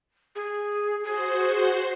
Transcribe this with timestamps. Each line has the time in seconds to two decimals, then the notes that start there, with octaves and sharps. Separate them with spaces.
0.35 G#4
1.04 F#4 G#4 C5